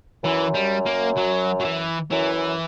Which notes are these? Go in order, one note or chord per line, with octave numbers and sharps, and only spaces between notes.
F#2 E3
G3
A#3
F#3
F#3
E3
F#2 E3
F#2